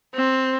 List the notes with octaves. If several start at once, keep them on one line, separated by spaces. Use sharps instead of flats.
C4